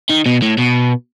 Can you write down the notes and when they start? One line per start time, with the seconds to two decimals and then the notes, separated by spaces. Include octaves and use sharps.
0.10 D#3
0.26 B2
0.42 A2
0.58 B2